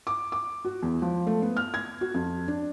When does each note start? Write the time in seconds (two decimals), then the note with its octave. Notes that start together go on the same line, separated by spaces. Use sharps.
0.07 D6
0.32 D6
0.65 F#4
0.82 E2
1.02 F3
1.27 A3
1.42 B3
1.57 F6
1.74 G#6
2.01 F#4
2.14 F2
2.48 D4